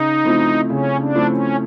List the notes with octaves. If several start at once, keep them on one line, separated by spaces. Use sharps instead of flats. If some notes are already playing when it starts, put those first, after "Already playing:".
Already playing: C#3 D#4
F3 A3 C4 E4
C#3 C#4
D4
F3 A3 C4 E4
C#4